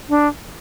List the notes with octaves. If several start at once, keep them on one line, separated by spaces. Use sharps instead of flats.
D4